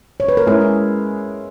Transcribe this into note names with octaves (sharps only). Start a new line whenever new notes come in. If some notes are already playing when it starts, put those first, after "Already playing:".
C#5
B4
A#4
G#3 C#4 E4 G#4